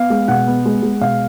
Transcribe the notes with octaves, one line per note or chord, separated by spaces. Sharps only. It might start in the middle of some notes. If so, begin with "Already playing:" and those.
Already playing: B3 F5
G#3
B2 F#5
B3
G#3
G#3
B2 F5